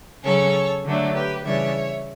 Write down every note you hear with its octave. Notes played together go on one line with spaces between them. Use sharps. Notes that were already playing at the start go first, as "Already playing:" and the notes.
C#3 F#3 C#4 A4 C#5
D3 F#3 A3 D4
G4 B4
C#3 E3 G3 D4 C#5 E5